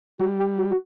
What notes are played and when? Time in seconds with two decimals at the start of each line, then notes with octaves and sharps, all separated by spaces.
0.20 G3 F#4
0.39 G4
0.58 F#4
0.71 F#4